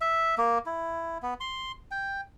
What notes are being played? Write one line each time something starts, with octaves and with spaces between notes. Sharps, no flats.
E5
A#3
E4
B3
C6
G5